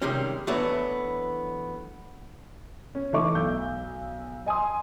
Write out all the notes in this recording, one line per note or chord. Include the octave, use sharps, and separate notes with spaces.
C3 D#3 G3 G#3 C#4
E3 F#3 A3 B3 D4 C#5
C#4
E3 A3 D#4 C#6 D6
B1 E6 G6
D#5 G#5 C6 D#6